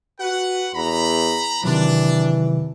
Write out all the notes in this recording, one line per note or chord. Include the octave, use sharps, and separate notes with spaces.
F#4 B4 F#5
E2 A#5 B5
C3 D#3 E3 F#3 D4